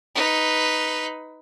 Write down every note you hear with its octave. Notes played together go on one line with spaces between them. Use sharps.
D#4 B4